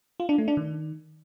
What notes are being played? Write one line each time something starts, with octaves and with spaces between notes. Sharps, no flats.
F4
D4
A3
D4
D#3